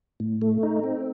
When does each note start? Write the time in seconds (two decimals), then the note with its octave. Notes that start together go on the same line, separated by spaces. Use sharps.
0.20 A2
0.42 A3
0.63 D#4
0.84 C4